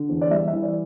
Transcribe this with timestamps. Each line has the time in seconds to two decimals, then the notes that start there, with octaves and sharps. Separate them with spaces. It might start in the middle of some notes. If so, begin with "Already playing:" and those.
Already playing: D3
0.09 E2
0.21 D5
0.31 G3 E5
0.48 E5
0.53 E3
0.63 D5